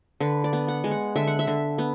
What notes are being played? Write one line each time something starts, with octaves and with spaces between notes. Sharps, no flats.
D3 B4
D5
B3
F#5
G#3
F#5
D3 E5
F#5
E5
D3
B3